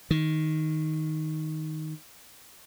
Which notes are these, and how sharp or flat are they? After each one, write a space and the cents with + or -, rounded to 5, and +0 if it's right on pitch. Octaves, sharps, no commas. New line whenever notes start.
D#3 +5